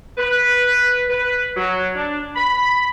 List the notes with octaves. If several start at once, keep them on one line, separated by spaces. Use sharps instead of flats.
B4
B4
F#3
D4
B5